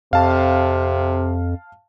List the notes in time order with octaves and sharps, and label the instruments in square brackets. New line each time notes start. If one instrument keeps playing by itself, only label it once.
[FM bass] F2 [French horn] C3 [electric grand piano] F5 A5